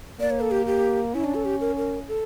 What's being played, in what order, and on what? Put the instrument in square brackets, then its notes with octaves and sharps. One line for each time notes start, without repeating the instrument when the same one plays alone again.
[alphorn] A#3 [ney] D5
[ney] C#5
A4
G4
G4
[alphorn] C#4 [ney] E4
[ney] D4
A4
G4
A#4
A#4
A4